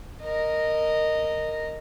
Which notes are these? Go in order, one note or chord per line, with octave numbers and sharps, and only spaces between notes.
A#4 D#5